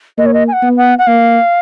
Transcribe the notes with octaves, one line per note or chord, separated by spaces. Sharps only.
A#3 D#5
C#5
D#5
G#5
F#5
B3
F#5
F#5
A#3 F5